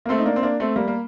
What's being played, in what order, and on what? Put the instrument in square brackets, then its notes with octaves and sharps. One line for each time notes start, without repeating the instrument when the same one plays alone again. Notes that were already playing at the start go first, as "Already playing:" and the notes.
[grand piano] A#3
A3 C4
D#4
A#3 D4
C4
A#3 D4
A3 C4
G3 A#3
A#3